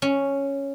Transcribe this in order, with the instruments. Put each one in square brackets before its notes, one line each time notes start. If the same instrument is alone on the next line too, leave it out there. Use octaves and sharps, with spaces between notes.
[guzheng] C#4